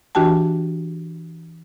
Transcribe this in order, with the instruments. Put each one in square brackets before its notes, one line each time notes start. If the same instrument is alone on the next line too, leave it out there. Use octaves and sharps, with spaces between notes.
[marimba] E3 D4 F#4 G4 G5 A5